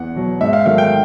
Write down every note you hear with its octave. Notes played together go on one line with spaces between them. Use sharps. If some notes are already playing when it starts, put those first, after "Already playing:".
Already playing: E2 F#5
B2 F#3
G#2 E5
F5
D#3 F#3 A3 F5
G5